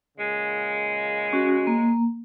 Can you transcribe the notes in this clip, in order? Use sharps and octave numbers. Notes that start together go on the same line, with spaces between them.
A#2 C#3 G#3
C#4 F#4
A#3